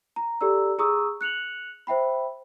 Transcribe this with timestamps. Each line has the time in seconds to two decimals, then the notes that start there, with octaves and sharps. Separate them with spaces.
0.16 A#5
0.41 G4 A4 D5 A#5 E6
0.78 G#4 A#5 C#6 D#6 E6
1.21 F#6 C#7 F7 F#7
1.87 C5 E5 G5 B5